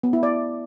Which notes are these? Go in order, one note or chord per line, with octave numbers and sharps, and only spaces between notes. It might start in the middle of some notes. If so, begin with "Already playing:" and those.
B3
E4
D5